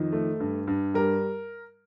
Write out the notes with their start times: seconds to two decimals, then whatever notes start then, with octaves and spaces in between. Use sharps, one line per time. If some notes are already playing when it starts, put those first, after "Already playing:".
Already playing: F2 D#3
0.12 A3
0.40 G2
0.67 G2
0.94 G3 A#4